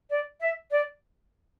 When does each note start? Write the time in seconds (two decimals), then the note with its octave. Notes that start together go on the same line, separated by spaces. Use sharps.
0.10 D5
0.40 E5
0.71 D5